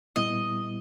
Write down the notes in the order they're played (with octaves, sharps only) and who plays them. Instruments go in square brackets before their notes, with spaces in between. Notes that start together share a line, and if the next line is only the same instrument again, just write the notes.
[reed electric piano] A#2 G3 B3 E4 [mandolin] D#5